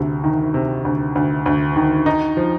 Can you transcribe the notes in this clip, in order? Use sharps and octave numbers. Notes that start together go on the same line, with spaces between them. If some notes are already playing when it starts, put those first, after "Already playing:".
Already playing: D2 C3
D#3
C3
D2
D2
D2
D#3
D#4
F3